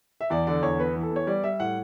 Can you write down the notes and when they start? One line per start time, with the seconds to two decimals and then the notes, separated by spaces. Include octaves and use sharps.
0.21 E5
0.30 E2 D5
0.47 D3 D5
0.62 E2 C#5
0.78 B3 B4
0.96 E3
1.03 A4
1.11 B3
1.16 C#5
1.27 G3 D5
1.44 G3 E5
1.60 A2 F#5